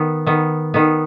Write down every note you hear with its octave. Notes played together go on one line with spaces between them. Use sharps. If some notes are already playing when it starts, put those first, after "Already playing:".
Already playing: D#3 B3
D#3 B3
D#3 B3